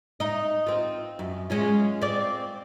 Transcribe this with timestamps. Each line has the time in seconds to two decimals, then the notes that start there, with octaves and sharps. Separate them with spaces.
0.20 D#4 D#5
0.67 C4 F4
1.19 F#2
1.50 G#3 C#4 F4
2.01 C4 D5